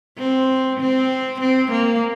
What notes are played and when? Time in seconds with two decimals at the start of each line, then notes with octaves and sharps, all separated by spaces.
0.18 C4
0.80 C4
1.41 C4
1.71 A#3